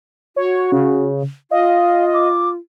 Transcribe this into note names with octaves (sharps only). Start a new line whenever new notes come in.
F#4 C#5
C#3
F4 D#5 F5
D6